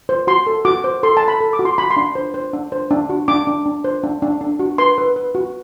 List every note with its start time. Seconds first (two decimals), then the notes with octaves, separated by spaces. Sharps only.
0.09 C5
0.27 F#4 C6
0.47 A4
0.65 F#4 D6
0.84 C5
1.03 A4 C6
1.17 A5
1.22 A4
1.28 B5
1.41 A4
1.53 D6
1.59 F#4
1.65 C6
1.78 F#4 B5
1.90 C6
1.97 D4
2.15 C5
2.34 C5
2.53 D4
2.72 C5
2.91 D4
3.09 F#4
3.28 D4 D6
3.47 D4
3.66 D4
3.84 C5
4.03 D4
4.22 D4
4.41 D4
4.59 F#4
4.78 B4 C6
4.98 B4
5.16 B4
5.35 F#4